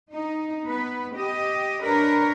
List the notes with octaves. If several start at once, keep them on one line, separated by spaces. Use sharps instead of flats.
D#4
B3 B4
G4 D#5
D4 A#4 B4 C#5